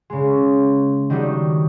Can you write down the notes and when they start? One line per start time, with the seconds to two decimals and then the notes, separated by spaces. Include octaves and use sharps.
0.10 C#3 G#3
1.10 D#3 F#3 G3 D4 D#4